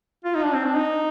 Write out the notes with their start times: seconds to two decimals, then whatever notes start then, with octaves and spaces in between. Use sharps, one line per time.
0.25 F4
0.35 D#4
0.45 D4
0.54 C4
0.65 D4
0.76 D#4